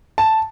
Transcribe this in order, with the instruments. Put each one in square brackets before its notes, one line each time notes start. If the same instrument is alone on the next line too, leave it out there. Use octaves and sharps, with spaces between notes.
[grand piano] A5